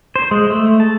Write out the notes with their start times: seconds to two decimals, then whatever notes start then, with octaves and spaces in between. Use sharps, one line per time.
0.16 C5
0.31 G#3
0.50 A3
0.80 A5